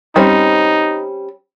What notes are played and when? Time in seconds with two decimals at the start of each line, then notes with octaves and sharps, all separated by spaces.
0.16 G3 C4 C#4 D#4